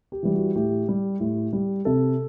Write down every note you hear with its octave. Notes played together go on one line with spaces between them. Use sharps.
G4
E3 G3
F#4
A2 G4
G3
A2
G3
C3 A4